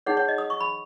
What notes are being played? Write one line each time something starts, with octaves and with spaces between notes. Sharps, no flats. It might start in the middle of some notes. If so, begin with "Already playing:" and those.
D#4 G#4 C#5 F#5
C#5 F#5
D#5
D#6
C#6
B5